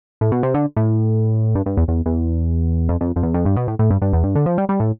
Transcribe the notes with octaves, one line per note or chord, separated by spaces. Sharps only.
A2
B2
C3
D3
A2
G2
G2
E2
E2
E2
F2
F2
F2
E2
F2
G2
B2
A2
A2
G2
G2
E2
G2
D3
F3
G3
G3
A2